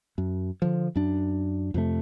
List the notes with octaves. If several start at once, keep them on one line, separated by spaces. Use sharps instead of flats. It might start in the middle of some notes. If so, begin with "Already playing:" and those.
F#2
D3 F3
F#2 D4
F2 C3 A3